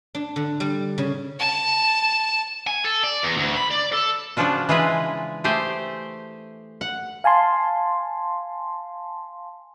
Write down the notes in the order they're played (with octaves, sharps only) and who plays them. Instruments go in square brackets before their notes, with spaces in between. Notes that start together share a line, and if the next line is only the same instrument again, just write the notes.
[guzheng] D4
D3
G3
C#3
[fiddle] A5
[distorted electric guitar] G#5
A4
D5
E2
D2
B5
D5
A4
[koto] C#3 F3 D4 F4 F#4
E3 G#3 F4 G#4 B4
A3 G4 G#4 C5
F#5
[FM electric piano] F5 G#5 A5 C6